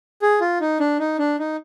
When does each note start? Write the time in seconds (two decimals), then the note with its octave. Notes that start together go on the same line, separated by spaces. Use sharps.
0.22 G#4
0.41 F4
0.61 D#4
0.80 D4
0.99 D#4
1.19 D4
1.39 D#4